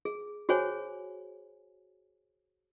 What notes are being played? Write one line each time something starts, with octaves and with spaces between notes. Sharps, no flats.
G#4
F#4 G#4 C5 C#5 G#5